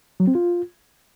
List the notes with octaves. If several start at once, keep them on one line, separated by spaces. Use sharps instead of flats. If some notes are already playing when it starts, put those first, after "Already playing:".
F#3
C4
F4